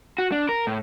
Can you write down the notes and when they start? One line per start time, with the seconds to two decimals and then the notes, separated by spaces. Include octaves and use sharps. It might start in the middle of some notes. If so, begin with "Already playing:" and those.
0.18 F#4
0.32 D4
0.49 A#4
0.67 A2